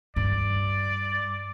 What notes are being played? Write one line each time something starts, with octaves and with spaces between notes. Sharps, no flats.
G2 D5